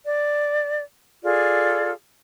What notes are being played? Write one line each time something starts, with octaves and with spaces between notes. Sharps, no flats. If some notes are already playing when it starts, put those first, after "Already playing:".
D5
F4 G#4 A4 D5